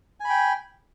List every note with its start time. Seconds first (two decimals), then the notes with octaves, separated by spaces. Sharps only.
0.20 G#5
0.25 B5
0.29 G5